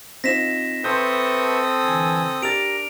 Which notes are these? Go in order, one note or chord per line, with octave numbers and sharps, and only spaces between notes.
C4 D#4 F4 A#6 B6 E7
C4 A4 B4 E5 C6 C#6 D#6 G6
D3 E3 G#5
D4 G4 A#4 A6 D7 F7